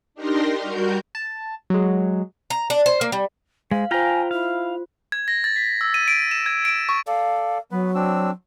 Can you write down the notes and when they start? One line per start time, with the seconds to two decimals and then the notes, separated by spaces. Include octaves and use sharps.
0.14 D4 D#4 G4 A#4 A#5 C6
0.61 G3 F#4 A#4 G6
1.15 A5
1.70 F#3 G#3
2.50 A#5
2.70 D4
2.86 C5
3.01 A#3
3.12 G3
3.71 G#3 C5 F5
3.91 F4 C5 F5 G5 G#5 A#5
4.31 E4 F5
5.12 G#6
5.28 A#6
5.44 A6
5.56 B6
5.81 E6
5.94 D#7
6.08 D7
6.31 E7
6.46 G#6
6.65 D7
6.89 C#6
7.07 A4 D5 F5
7.71 F#3 B3 B4
7.95 C4 D4 E6